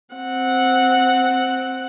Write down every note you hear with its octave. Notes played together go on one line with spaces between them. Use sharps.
C4 F#5